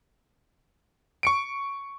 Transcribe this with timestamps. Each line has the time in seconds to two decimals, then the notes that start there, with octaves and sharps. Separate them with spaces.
1.23 C#6 C#7 D7